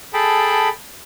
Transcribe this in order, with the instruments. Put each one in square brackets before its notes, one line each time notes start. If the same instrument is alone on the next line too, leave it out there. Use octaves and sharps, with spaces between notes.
[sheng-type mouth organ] G#4 A4 G5 A5 B5